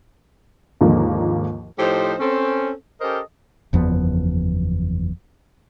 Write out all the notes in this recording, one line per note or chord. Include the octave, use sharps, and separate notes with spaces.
D#2 G#2 D3 F3 A#3
A2 F3 D#4 G4 C5
C4 C#4 A4
C#4 G4 A4 A#4 C5 D#5
F#1 E2 F3 B3